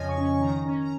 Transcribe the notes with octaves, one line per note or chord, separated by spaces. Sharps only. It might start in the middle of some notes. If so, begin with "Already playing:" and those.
Already playing: F2 C#3 F3 C#5 D#5 G#5
C#6
C#4
C#6
D#3 A#5
C#4
A#5